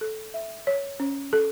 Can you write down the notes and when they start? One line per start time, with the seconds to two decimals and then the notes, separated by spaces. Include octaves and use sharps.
0.01 A4
0.34 E5
0.67 C#5
1.00 C#4
1.33 A4